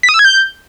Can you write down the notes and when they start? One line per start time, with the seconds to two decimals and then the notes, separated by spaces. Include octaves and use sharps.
0.03 B6
0.09 D#6
0.14 E6
0.19 G#6
0.25 G6